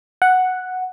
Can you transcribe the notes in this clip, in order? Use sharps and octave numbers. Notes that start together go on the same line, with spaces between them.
F#5